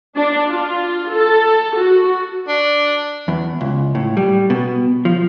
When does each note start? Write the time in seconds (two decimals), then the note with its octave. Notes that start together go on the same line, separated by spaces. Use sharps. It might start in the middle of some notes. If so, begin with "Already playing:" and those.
0.15 D4
0.46 F4
1.09 A4
1.75 F#4
2.48 D4
3.28 E2
3.61 C#2
3.95 A2
4.17 G3
4.50 B2
5.05 F3